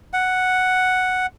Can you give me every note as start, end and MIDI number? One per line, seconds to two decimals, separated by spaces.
0.13 1.26 78